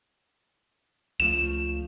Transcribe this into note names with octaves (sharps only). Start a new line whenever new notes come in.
C#2 F3 A3 E7